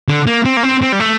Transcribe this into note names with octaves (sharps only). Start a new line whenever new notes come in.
D3
A#3
C4
A#3
C4
C4
G3
A3